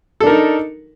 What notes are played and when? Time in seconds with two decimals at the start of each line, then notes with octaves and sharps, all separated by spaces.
0.20 A4
0.24 D4
0.27 A#4
0.30 D#4